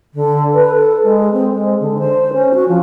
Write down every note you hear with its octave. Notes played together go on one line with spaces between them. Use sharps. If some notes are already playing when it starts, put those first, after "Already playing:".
D3
B4
A4
G#3
C4
G#3
D3
C5
C#4
F#4
F3